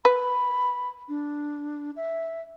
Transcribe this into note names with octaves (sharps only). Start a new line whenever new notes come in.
B4 B5
D4
E5